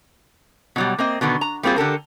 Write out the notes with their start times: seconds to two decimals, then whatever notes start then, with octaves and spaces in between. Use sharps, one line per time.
0.76 B2 F#3 G3
0.99 A#3 C4 D#5
1.21 B2 D3 D#3 B3
1.41 A#5
1.63 G3 A#3 C4 F4 G#4
1.76 D3 G4 A4 A#4